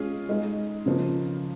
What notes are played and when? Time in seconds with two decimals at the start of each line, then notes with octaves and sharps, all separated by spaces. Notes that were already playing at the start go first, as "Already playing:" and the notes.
Already playing: G#3 C#4 F4 G#4
0.29 G#3 D#4 G#4
0.86 C#3 F3 A#3